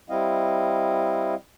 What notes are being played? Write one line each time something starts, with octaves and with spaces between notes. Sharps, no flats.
G3 C4 E4 D#5 F5